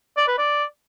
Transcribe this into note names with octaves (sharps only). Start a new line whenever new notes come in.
D5
B4
D5